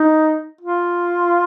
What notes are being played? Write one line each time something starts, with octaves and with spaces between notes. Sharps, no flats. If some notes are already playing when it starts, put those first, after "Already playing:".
Already playing: D#4
F4